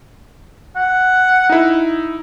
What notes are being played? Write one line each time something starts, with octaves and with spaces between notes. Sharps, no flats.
F#5
D#4 E4